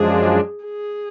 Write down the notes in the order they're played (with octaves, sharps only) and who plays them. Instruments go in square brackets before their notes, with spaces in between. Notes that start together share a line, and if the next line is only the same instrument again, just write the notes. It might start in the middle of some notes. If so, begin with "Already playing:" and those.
Already playing: [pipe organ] F#2 F3 G#3 D4 [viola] G#4
[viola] G#4